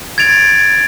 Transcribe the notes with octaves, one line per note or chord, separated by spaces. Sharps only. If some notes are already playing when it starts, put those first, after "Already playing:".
G#6 A6 D7 F7